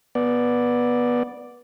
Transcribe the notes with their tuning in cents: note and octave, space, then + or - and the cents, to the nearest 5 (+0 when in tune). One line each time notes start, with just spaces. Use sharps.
B3 -15 D5 +0